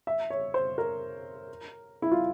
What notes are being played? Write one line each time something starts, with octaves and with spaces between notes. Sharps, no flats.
E5
C#5
C5
A#4
E4
F4